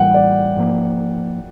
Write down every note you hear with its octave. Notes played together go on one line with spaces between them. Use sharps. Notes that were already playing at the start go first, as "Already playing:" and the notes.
Already playing: A2 E3 G3 F#5 G5
D5
G#2 F3 A#3